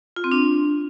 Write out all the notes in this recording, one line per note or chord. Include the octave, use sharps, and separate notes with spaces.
F4
C4
D4